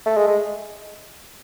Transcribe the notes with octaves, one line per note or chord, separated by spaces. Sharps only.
A3
G#3
G#3